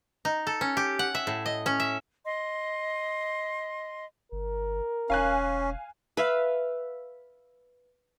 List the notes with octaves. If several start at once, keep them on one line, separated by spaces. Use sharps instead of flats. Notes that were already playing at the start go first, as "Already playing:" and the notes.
D#4
A4
C#4
G4
F#5
E5
A2
D#5
C#4
E5
D#5 C6
G1 A#4
E1 C#4 F5 G#5 F#6
B4 E5 F5